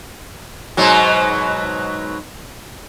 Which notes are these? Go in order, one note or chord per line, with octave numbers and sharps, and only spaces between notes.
G#2 B2 F#3